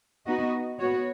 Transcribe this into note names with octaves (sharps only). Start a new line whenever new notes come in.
B3 D#4 F#4 D#5
B3 F#4 C#5